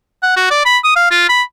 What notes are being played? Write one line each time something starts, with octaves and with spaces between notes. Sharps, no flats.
F#5
F#4
D5
B5
D#6
F5
F4
B5